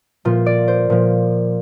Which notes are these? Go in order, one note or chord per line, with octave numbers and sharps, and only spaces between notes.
A#2 F3 F4
D5
C5
A#2 F3